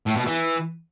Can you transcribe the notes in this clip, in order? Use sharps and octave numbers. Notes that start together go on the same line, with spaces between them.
A2
B2
E3